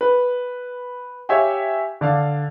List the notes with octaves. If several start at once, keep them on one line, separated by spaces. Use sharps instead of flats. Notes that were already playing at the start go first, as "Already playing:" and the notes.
B4
G4 C#5 E5 F5 G5 G#5
D3 D5 F5